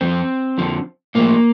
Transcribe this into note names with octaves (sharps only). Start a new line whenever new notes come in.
F2 D3 F3 C4
F2 D3 F3
A2 F3 A#3